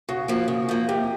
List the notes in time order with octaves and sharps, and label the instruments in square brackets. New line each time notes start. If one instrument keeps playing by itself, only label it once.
[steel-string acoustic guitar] C#3 [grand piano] F#4
[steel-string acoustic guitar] F3 A#3
C#3
F3 A#3
[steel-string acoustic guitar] C3 [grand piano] G4